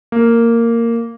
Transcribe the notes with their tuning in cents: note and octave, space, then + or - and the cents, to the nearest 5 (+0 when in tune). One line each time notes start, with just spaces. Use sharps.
A#3 -10